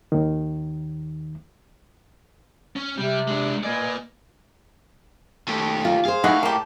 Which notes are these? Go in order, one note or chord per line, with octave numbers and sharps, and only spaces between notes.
D#2 D#3
C#4
C3 G3
G#3 D4
A#3 B4 D5 D#5 G#5
D#2 D#3 A3 G4
F4 D5
G#4 C5 F5
A2 E3 G#3 D#4 F#4 D#5
A#3 G4 A5